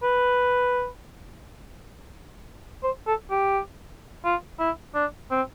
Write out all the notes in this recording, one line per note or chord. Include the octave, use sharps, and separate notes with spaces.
B4
C5
A4
G4
F4
E4
D4
C4